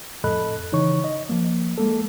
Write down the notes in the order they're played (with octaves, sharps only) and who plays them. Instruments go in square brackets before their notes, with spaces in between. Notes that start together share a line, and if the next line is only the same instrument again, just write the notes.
[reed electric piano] F2 A2 A4 D#5 B5 F#6
C#3 E3 D#4 C#5 C#6
D#5
F3 A#3
G#3 A#3 A4